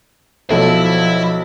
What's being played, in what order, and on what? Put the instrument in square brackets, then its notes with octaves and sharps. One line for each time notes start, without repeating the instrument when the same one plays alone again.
[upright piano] B1 [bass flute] F3 [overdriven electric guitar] E4 E5 [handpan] A4